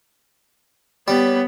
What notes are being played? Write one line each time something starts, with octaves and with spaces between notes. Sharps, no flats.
G3 B3 C#5